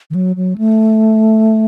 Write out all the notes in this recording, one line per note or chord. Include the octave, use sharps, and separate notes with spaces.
D#3
F#3
F#3
A3